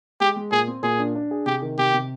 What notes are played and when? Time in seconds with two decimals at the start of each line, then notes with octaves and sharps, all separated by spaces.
0.20 G#3 G4
0.36 G#3
0.51 A#2 G#4
0.67 C4
0.83 A#2 G#4
0.99 D4
1.15 D4
1.31 G#4
1.46 C3 G4
1.62 D#3
1.78 C3 G4
1.93 C3